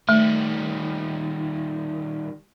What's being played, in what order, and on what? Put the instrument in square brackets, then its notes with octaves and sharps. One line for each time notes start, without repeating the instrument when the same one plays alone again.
[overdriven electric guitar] D#3 G3 [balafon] A3